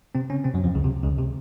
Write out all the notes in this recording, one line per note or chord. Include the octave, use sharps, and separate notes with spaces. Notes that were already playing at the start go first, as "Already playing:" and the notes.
C3 C4
C#3 C#4
C3 C4
F#2 F#3
F2 F3
C#2 C#3
C3
C#2 C#3
C3